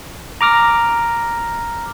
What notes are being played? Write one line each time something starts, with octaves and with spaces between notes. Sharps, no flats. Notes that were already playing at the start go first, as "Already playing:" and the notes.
A#5 D6 F6 A#6